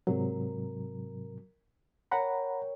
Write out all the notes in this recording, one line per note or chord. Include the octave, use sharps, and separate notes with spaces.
G#2 C3 F#3 A#4
A#4 C#5 F#5 G5 A#5 B5